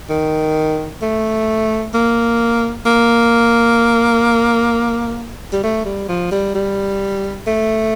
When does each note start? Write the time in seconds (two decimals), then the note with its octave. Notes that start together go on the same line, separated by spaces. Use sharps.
0.10 D#3
1.02 A3
1.94 A#3
2.86 A#3
5.53 G3
5.63 A3
5.85 G3
6.09 F3
6.31 G3
6.55 G3
7.47 A3